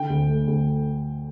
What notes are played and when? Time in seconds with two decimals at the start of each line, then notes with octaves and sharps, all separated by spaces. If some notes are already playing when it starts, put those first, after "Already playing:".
Already playing: D3 G5
0.10 D2
0.29 A3
0.47 D2